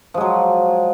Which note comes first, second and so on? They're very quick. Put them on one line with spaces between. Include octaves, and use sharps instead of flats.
F3 G#3 F#3